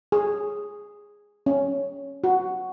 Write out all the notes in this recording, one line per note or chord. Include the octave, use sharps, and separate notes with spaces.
G#4
C#4
F#4